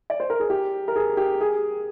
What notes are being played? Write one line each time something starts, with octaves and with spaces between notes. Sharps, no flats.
D5
C5
A#4
G#4
G4
A#4
G#4
G4
G#4